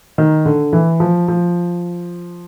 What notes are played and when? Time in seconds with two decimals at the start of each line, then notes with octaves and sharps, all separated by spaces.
0.18 D#3
0.46 D3
0.73 E3
1.00 F3
1.28 F3